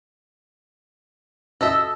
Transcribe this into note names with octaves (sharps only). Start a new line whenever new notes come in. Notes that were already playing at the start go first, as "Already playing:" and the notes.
F#4 A4 D#5 E5 E6